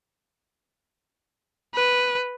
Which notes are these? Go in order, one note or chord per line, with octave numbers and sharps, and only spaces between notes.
B4